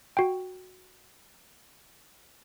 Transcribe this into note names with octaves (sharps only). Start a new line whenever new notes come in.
F#4 G5